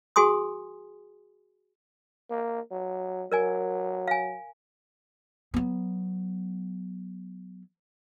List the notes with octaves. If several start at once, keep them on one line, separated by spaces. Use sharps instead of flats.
F#4 G#4 G#5 C6 D#6
A#3
F#3
F#3 A#4 D5 G#5
F5 G#5
F#3 B3